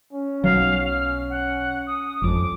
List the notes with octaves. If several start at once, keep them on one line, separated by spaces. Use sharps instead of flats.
C#4
B1 F#3 F5
F6
F#5
D#6
G#1 F2 D6